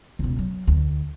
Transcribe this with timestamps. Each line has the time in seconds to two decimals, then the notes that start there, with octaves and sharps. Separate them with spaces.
0.19 E1 C#2
0.39 F#3
0.67 D2